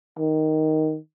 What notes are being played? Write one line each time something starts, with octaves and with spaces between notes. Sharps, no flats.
D#3